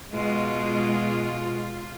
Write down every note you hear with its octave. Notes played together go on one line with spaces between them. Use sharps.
B2 G#3 F4